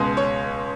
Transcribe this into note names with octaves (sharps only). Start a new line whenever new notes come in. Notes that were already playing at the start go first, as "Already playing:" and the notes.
Already playing: C#2 B2 G#3
C#5